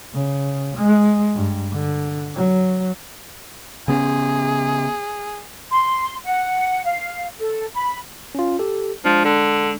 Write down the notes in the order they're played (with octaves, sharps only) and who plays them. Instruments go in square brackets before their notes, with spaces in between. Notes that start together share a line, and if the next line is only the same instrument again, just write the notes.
[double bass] C#3
G#3
G2
D3
F#3
[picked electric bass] C#3 B3 C#4 [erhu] G#4
[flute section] C6
F#5
F5
A4
B5
[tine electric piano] C#4 F4
G4 A4
[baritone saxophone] F3 [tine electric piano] G#3 D4
[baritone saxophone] D3